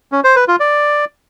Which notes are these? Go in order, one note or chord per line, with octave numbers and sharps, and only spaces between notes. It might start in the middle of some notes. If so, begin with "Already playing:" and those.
C#4
C5
B4
F4
D5